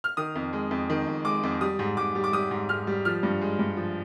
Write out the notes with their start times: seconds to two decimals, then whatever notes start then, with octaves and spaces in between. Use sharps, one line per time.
0.04 F6
0.17 D#3 D#6
0.35 F2
0.53 G#3
0.71 F2
0.90 D#3
1.07 F2
1.25 G#3 D6
1.44 F2
1.61 G3 D#6
1.79 G#2
1.97 G#2 D6
2.15 G3
2.24 D6
2.33 G3 D#6
2.51 G#2
2.69 G#2 F6
2.87 G3
3.05 F3 F6
3.23 G2
3.41 G#3
3.59 G2
3.76 F3